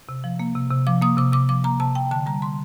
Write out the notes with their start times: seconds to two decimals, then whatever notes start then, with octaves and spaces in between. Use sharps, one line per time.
0.09 C3
0.24 F3
0.39 A#3
0.55 C3
0.71 C3
0.87 F3 D6
1.02 A#3 D#6
1.17 C3 D6
1.33 C3 D6
1.49 F3 D6
1.64 A#3 A#5
1.80 C3 A5
1.95 C3 G5
2.11 D3 A5
2.26 G3 A#5
2.42 C6